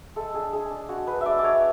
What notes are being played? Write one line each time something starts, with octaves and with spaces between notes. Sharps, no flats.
G#3 A4
D4 G#4
G#3 G#4
D4
G#3 F#4
D4 B4
G#3 D5 E5
D5
D4 C#5